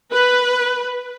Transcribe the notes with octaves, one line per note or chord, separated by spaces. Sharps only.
B4